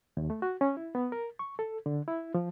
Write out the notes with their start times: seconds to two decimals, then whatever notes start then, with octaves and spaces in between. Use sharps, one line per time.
0.17 D#2
0.30 A3
0.42 F#4
0.61 C#4
0.77 E4
0.95 B3
1.12 A#4
1.39 C#6
1.59 A4
1.86 D3
2.08 E4
2.34 F3